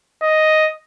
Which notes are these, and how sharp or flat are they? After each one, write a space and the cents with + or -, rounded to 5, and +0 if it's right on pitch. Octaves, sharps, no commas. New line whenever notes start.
D#5 +5